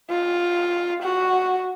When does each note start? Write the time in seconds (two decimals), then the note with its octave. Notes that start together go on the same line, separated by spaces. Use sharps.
0.11 F4
1.03 F#4